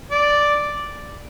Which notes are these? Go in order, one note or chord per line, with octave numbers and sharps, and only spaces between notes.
D5